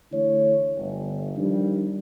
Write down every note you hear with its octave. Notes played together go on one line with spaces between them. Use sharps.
D3 E3 A3 E4 C#5
G1
D#3 F3 G3 D4